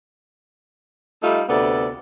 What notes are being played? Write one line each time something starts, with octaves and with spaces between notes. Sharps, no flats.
G3 A3 D#4 F4 A4
D2 C3 B3 A4 D5